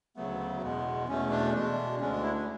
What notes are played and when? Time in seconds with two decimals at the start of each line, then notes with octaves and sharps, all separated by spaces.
0.16 D2 C#3 F#3 A3 B3
0.62 E2 B2 G#3 B3
1.08 E2 B2 A3 C#4
1.31 D4
1.54 B2 G#3 D4
2.00 D2 D3 G#3 C#4
2.12 D4
2.23 E4
2.35 D4